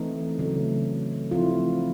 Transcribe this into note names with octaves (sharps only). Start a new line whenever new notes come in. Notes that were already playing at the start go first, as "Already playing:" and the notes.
Already playing: E3 A3 C4 D#4
C#3 F#3 A3
F3 A3 C4 E4 F4